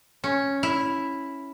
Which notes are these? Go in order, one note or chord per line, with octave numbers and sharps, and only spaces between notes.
C#4
E4